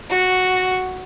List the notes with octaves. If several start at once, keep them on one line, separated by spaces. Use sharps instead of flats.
F#4